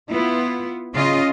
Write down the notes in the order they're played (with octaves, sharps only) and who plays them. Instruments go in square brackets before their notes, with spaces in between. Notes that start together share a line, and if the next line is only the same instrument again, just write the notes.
[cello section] B3 E4 F4
C#3 F4 D#5